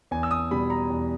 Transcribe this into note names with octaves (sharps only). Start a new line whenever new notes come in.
E2 G#5
E6
D#6
B2 G3 B5
A#5
E2